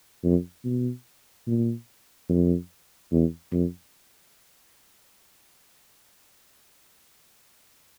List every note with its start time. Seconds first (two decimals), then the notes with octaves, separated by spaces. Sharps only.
0.24 F2
0.65 B2
1.47 A#2
2.29 F2
3.12 E2
3.52 F2